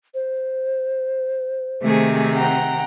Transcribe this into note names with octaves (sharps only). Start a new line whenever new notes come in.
C5
C3 D#3 A3 G#4
F#5 G5 A#5